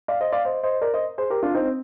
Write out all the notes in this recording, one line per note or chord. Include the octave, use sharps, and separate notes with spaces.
D5 F5
C5 D#5
D5 F5
C5 D#5
C5 D#5
A#4 D5
C5 D#5
G#4 C5
G4 A#4
D4 F4
C4 D#4